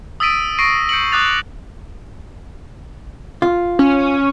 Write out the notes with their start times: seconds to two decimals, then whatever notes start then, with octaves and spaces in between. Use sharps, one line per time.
0.20 D#6 E6 A6 B6 D7 D#7
0.58 C#6 A#6 C7 D7 D#7
0.89 G6 C#7 D7 F#7
1.12 D6 D#6 F#6 A6 F7
3.42 F4
3.79 C#4